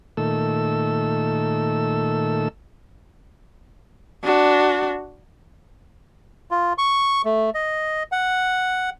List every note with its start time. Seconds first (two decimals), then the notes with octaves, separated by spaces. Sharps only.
0.17 A#2 D#3 A3 A4 E6
4.24 D4 F#4
6.51 F4
6.78 C#6
7.25 A3
7.54 D#5
8.12 F#5